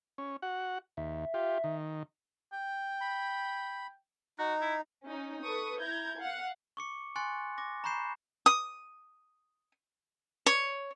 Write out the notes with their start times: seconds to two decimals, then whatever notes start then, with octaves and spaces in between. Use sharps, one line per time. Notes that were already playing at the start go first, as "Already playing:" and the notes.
0.18 C#4
0.42 F#4 F#5
0.97 D#2 E5
1.34 F4 G4
1.64 D#3
2.53 G5
3.01 B5
4.39 D#4 F#4
4.61 E4
5.06 C#4 D#4
5.43 A4 B4 C#6 D#6
5.80 E4 A#5 G6 G#6
6.18 F5 F#5
6.77 C#6 D6 C#7
7.16 G#5 C6 C#6 F#6 A6 C#7
7.58 D6 A#6
7.84 A#5 B5 C#6 G6 C7 E7
8.46 D#6
10.46 C#5